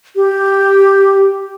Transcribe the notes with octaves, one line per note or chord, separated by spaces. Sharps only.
G4